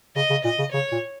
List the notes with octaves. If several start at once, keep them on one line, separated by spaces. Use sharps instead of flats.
C#3 D#5
C#3
A#2 D#5
C#3
C#3 C#5
A#2